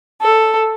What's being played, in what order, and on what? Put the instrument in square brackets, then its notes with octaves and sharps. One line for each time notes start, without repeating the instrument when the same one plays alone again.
[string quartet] A4